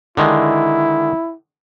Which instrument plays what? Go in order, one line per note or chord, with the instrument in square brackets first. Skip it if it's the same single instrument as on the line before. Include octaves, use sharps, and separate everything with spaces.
[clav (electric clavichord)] D3 D#3 G#3 [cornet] E4